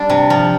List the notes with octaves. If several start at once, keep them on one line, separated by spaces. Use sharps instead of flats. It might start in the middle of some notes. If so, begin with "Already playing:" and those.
Already playing: G3 D4
C3
F3